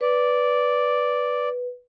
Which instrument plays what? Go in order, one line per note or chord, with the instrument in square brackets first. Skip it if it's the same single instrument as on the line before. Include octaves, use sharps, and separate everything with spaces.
[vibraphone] B4 [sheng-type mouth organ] D5